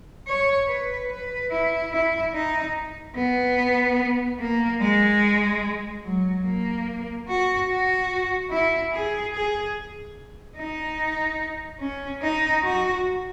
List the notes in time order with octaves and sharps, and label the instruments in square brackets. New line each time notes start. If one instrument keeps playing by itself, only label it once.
[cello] C#5
B4
B4
E4
E4
D#4
B3
A#3
G#3
F#3
A#3
F#4
F#4
E4
G#4
G#4
D#4
C#4
D#4
F#4